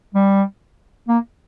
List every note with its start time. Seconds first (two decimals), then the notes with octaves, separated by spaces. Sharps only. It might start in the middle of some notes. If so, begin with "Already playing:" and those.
0.15 G3
1.08 A#3